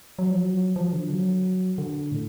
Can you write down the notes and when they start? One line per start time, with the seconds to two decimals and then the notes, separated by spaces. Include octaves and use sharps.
0.19 F#3
0.30 F3
0.41 F#3
0.76 F3
0.93 D3
1.10 F#3
1.78 D3
2.12 A2